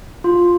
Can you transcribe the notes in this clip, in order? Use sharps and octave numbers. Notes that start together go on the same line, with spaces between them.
F4